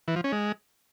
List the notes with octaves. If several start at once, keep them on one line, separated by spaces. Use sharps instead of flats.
E3
F3
C#4
G#3